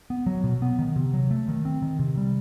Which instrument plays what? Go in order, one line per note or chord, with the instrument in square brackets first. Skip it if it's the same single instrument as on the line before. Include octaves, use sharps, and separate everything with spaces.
[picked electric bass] B3
F#3
B2
B3
D#3
C3
F#3
A3
D#3
C4
D#3
C3
G3